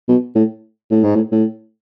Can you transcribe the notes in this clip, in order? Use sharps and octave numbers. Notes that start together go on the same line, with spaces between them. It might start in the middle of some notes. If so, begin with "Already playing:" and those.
B2
A2
A2
G#2
A2
A2